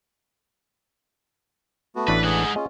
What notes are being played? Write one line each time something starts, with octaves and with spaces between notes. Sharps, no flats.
A3 B3 F#4
A1 E3 D4 B4
G#3 G#4 F#5 G#5
C#4 F4 G#4 D#5